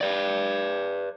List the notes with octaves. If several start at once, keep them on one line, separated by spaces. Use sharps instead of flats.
B4 D5